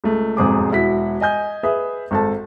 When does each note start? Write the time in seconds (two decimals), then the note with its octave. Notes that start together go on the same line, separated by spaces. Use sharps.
0.04 C#2 A3
0.37 E1 F2 G#2 G#4 C5 D6
0.71 E1 E4 F#4 B6
1.21 D#5 G#5 G6
1.63 G#4 B4 E5
2.11 G#1 A4 A5